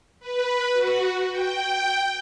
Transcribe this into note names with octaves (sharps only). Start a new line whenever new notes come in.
B4
F#4
G5